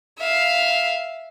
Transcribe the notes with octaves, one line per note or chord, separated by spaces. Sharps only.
E5 F5